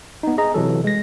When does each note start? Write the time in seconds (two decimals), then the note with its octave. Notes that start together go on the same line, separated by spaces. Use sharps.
0.23 B3 D#4
0.38 G#4 D#5 A#5
0.54 C3 E3 F#3 A4
0.84 G#3 A#6